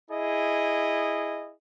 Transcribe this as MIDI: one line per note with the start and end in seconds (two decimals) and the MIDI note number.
0.11 1.54 64
0.11 1.54 68
0.11 1.54 75